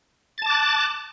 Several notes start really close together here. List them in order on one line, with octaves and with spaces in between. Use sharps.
A6 A5 D6 F#6